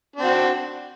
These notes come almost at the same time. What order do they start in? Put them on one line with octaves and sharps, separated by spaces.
D4 C4 F#4